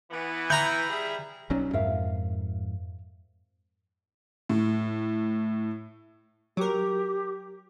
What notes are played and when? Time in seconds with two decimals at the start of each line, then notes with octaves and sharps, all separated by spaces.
0.11 E3 B3
0.50 E4 A#5 G6
0.89 G3 G#4 E5
1.50 B1 F#3 C#4 D#4 C#5 D5
1.73 F2 G#2 A#4 E5 F5
4.49 A2
6.57 F#3 G4 A#4